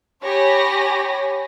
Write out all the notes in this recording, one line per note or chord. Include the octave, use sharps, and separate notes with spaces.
G4 C#5 G#5 B5 A#6